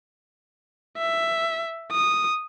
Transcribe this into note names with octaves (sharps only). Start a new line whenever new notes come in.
E5
D#6